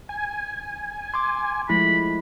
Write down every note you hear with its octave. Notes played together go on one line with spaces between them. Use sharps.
G#5
C6 D6
F3 G#3 A3 E4 B5